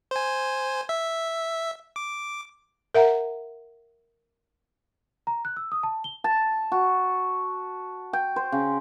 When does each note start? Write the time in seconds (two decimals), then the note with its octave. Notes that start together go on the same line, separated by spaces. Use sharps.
0.11 C5 G#5
0.89 E5
1.96 D6
2.94 A#4 E5 F#5 A#5
5.27 A#5
5.45 F#6
5.57 E6
5.72 D#6
5.83 A5
6.04 G7
6.24 A5
6.72 F#4
8.13 G5
8.36 C5
8.52 C#3